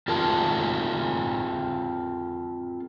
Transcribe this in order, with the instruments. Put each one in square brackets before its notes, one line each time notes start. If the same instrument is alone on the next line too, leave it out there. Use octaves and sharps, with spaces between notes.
[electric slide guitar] C4 F4 G#4 A#4 A5